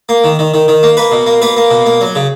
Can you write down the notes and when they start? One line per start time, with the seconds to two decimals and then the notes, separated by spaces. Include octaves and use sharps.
0.09 A#3
0.24 D#3
0.39 D#3
0.54 D#3
0.68 D#3
0.83 A#3
0.97 A#3 B4
1.12 B2
1.26 A#3
1.42 A#3 B4
1.57 A#3
1.71 B2
1.86 A#3
2.01 F#3
2.15 C#3